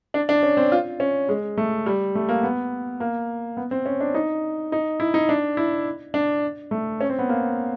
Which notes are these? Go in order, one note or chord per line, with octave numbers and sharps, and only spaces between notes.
D4
D4
C#4
C4
F4
C#4
G#3
A3
G3
A3
A#3
B3
A#3
B3
C4
C#4
D4
D#4
D#4
E4
D#4
D4
E4
D4
A3
C#4
C4
B3
A#3